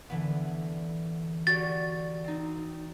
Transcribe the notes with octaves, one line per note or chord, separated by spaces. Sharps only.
D3 E3 B3
F#4 G4 D5 A6
C4 D#4